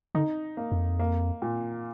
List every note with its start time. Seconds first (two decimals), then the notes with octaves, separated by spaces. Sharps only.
0.15 D3 D#4
0.57 A#3
0.72 F2
0.99 A#3
1.42 A#2